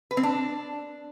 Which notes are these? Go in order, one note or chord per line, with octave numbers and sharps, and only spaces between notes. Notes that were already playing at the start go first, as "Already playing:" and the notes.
B4
C4
D4